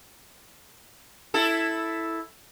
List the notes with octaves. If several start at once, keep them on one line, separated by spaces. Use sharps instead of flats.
E4 A4